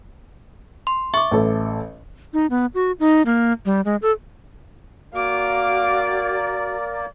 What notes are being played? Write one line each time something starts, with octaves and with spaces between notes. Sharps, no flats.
C6
E5 C#6 D6
A1 A4
D#4
B3
F#4
D#4
A#3
G3
G#3
A4
A#3 F#4 A#4 D5 F5 D6